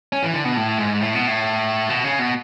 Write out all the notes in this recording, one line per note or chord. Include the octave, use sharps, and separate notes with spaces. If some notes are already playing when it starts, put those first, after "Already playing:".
C#4
E3
D3
B2
A2
G#2
A2
B2
A2
B2
C#3
B2